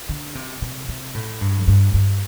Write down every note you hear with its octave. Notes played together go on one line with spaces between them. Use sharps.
D3
C3
C3
C3
A2
G2
F2
G2
G2